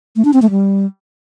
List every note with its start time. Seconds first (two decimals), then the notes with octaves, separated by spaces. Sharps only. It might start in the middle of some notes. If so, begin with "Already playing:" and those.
0.16 A3
0.25 D4
0.33 C4
0.42 A3
0.51 G3